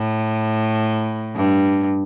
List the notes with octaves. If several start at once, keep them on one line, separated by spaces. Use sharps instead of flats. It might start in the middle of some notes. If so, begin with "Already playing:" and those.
Already playing: A2
G2